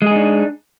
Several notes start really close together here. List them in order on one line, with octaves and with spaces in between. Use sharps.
G#3 G#4 D#4 D4